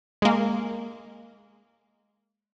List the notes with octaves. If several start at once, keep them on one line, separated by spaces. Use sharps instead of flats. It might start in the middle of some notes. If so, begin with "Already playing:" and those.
G#3 A#3